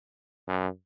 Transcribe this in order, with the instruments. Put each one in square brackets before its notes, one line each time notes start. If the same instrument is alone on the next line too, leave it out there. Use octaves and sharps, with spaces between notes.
[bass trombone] F#2